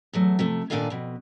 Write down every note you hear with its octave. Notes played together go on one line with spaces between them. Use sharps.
E2 F#3 A3
C3 F3 A3
A#2 D#3 D4 A4 F5 G#5
F2 B2